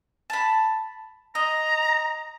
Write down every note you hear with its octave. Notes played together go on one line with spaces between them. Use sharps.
A5 B5
D#5 A#5